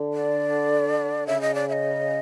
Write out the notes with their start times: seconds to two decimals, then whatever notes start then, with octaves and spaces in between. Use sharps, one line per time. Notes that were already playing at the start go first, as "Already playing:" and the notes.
Already playing: D3
0.14 D5
1.27 C#3 E5
1.41 D#5
1.55 D5
1.69 E5
1.73 D#5